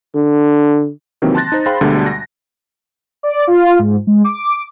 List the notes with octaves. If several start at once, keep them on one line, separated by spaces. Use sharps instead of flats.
D3
C3 D#3 E3 F#3 A#3 C4
A5 C6 F#6 A6 A#6
D#4 C5
G#4 C5 F5 G5 B5 C6
D2 B2 D3 G3 G#3
A#6
D5
F4
G#2
G#3
D6